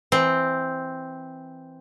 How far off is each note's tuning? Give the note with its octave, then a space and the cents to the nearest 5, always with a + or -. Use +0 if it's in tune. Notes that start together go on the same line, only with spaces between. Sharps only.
E3 +0 C4 +0